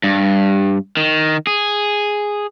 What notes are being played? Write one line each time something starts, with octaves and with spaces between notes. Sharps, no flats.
G2
D#3
G#4